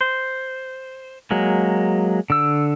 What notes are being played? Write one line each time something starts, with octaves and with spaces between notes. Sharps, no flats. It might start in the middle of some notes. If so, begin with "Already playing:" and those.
C5
F#3 G#3 A#3
D3 E6